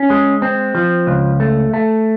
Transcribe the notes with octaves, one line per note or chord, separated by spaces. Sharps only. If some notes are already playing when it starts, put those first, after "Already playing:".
Already playing: C#4
G#3
C4
F3
C#2
A3
A3